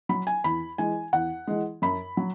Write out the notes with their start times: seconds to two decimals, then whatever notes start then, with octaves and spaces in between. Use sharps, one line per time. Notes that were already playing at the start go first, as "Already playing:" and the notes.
0.09 F#3 B5
0.27 G#5
0.44 E2 B5
0.78 E3 G#3 G#5
1.13 E2 F#5
1.47 E3 G#3
1.82 F#2 B5
2.17 F#3